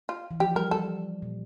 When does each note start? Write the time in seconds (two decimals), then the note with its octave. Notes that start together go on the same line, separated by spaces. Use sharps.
0.09 F4
0.31 E3
0.40 F3 G4
0.56 G3 A#4
0.71 G3 A4
1.22 A#2